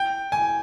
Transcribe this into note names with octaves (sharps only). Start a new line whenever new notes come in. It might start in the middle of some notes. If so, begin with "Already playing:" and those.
Already playing: G5
G#5